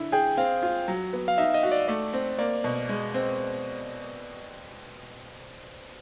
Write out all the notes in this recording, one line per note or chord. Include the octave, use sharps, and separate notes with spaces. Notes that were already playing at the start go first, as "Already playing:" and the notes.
Already playing: D3 E4
G#4 G5
C4 F5
F4
F#3
B3
F5
D#4 E5
D#5
F#4
D5
A3 D5
C4
A#3 D5
B2
G#3
C4